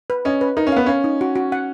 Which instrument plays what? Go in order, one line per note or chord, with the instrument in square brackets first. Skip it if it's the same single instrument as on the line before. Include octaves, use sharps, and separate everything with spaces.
[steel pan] B4
[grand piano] C#4 [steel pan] D#5
[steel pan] B4
[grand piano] D#4 [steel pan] A#4
[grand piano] C#4
[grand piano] B3 [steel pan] F5
[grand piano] C#4 [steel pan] F5
[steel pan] D#4
F#4
F#4
F#5